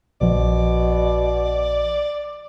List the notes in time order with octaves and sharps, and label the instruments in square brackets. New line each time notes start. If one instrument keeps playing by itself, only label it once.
[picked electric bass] A#1 F3 [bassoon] B2 [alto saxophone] D5